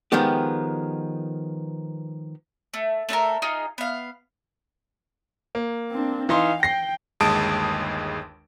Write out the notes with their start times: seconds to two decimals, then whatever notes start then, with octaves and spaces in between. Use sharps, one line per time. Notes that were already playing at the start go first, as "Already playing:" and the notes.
0.12 D#3 F3 G#3 B3 G4
2.74 A3
3.09 A3 D4 A4 A#4
3.42 D#4 F4 G#4
3.78 B3 F5
5.55 A#3
5.91 C4 D4
6.29 E3 D#4 F5 C6
6.63 G5 A#6 C7
7.20 G1 D#2 G#3 A5 D#6 D7